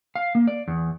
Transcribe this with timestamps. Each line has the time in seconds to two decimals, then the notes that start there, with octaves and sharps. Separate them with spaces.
0.16 F5
0.35 A#3
0.47 D5
0.68 E2